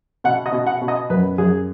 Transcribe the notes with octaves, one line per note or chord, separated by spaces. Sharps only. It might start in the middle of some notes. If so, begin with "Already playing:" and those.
B2 F#5
D#5
B2
F#5
B2
D#5
F#2 B4
F#2 G#4